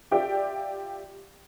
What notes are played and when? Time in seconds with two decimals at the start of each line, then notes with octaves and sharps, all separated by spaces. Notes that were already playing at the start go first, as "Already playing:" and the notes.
0.11 F4 G4 D5 E5 G5